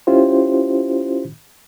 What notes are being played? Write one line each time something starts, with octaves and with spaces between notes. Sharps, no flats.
C#4 E4 F4 G4 C5